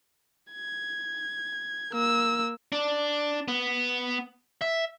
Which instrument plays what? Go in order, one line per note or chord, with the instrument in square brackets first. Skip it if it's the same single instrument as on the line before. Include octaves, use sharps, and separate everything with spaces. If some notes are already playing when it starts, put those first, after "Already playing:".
[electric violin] G#6
A#3 E6
[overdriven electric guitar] D4
B3
E5